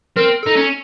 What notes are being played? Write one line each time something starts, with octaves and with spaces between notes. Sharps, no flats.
C4 A#4
D#4 A4
C#4